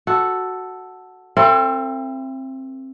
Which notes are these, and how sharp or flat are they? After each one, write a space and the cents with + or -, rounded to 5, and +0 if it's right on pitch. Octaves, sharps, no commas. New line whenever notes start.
F#4 +0 A4 +0
C4 +20 E4 +45 A4 +45